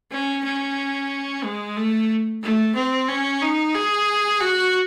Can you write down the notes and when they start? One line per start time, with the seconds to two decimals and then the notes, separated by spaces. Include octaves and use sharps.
0.12 C#4
0.45 C#4
1.44 G#3
1.77 A3
2.43 A3
2.75 C4
3.08 C#4
3.42 D#4
3.74 G#4
4.40 F#4